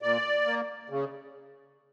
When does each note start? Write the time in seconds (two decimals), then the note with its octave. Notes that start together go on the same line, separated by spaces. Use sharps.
0.02 A#2 D5
0.46 A#3
0.90 C#3